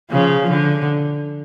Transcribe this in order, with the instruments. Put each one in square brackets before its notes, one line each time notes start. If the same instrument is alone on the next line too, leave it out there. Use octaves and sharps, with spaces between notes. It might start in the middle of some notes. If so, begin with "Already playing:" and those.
[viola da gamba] C#3 F3
D3